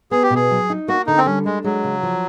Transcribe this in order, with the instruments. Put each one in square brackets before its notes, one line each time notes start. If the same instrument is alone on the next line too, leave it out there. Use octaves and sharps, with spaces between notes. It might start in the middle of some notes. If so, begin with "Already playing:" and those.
[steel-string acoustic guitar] B3 [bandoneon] G#4
[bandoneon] G4
[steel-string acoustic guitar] B2 [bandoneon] G#4
[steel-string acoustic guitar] F#3
D#4
[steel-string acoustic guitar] A#3 [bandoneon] F#4
[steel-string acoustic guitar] D3 [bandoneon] D#4
[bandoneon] C4
[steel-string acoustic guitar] G3 [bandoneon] C#4
[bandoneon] G#3 [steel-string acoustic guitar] D4
[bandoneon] F#3 [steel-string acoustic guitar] G#3
[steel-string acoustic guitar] C#3
F3